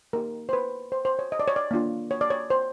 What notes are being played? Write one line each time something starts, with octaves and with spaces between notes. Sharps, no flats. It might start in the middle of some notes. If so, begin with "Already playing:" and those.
A#3 D#4 G4 A#4
C5
B4
C5
C5
C#5
D#5
D5
C#5
D5
A#3 D4 F4
C#5
D5
C#5
C5